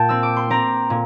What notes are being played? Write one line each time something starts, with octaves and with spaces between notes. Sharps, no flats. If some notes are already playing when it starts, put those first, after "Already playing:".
Already playing: A#2 G5 A5
C4 E6
D6
C6
C4 A#5
A#2